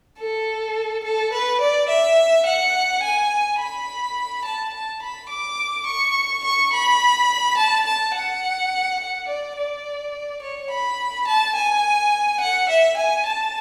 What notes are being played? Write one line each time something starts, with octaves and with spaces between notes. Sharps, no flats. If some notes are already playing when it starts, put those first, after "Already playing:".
A4
A4
B4
D5
E5
F#5
G#5
B5
A5
A5
B5
D6
C#6
C#6
B5
A5
A5
F#5
F#5
D5
D5
C#5
B5
A5
G#5
F#5
E5
G#5
A5